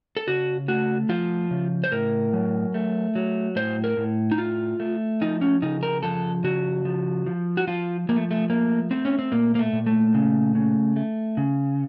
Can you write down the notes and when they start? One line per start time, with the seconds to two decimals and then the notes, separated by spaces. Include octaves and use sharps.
0.17 A4
0.27 C#3 F#4
0.68 A3 F#4
1.09 F3 F4
1.51 C#3
1.84 C5
1.92 A2 A#4
2.33 F#3
2.74 A3
3.15 F#3
3.56 A2 C5
3.84 A#4
3.97 A2
4.31 D#4
4.38 A3 F4
4.80 A3
5.21 F3 D#4
5.41 C#4
5.62 C#3 D#4
5.83 A#4
6.03 F3 A4
6.44 C#3 F#4
6.85 F3
7.26 F3
7.57 F#4
7.67 F3 F4
8.09 F3 A#3
8.16 A3
8.31 A3
8.50 A3 A#3
8.91 A3 C4
9.05 C#4
9.19 C4
9.32 A#2 A#3
9.55 A#3
9.59 A3
9.73 A#2
9.86 A3
10.14 C#3
10.55 C#3
10.96 A3
11.37 C#3